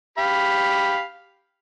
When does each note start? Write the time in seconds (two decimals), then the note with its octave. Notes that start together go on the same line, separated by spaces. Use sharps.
0.18 G4 F5 B5